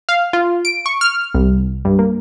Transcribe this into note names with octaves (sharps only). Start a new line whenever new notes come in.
F5
F4
D7
C#6
F6
C2
G2
A#3